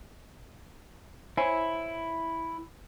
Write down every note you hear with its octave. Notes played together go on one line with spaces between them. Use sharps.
E4 C5 C#5 G#5